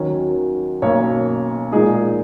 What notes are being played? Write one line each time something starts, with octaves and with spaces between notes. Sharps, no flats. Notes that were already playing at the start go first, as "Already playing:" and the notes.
Already playing: D#2 D#3 F#3 C#4
B1 B2 A#3 C#4 C#5
A#2 F3 G#3 D#4 G#4